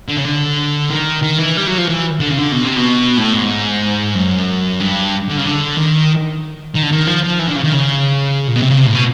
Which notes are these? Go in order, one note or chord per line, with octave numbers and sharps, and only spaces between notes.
D3
C#3
D3
D#3
D#3
E3
G3
F#3
F3
E3
D3
C#3
D3
B2
C3
B2
A2
G#2
F#2
G2
D3
C#3
D3
D#3
D#3
D3
D#3
F3
F3
E3
D3
C#3
D#3
C#3
A#2
B2
C3
C#3
C3
A2
B2